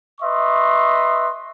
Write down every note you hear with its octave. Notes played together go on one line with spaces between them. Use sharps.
B4 D#5 E5 C6 C#6